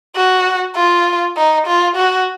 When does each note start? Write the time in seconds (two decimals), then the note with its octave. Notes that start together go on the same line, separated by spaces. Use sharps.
0.16 F#4
0.76 F4
1.37 D#4
1.67 F4
1.96 F#4